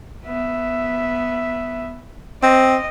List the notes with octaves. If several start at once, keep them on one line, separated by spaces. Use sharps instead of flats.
B3 E5
C4 D#5